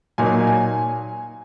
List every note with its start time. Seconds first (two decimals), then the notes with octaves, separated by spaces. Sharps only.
0.18 A#2 F#3 A#3 D#4 G#5
0.47 G#5